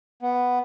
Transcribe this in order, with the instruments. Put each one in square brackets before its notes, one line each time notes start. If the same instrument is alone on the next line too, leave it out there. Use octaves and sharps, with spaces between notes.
[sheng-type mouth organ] B3